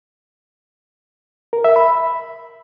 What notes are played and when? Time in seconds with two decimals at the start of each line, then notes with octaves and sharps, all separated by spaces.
1.53 A#4
1.64 E5
1.76 B5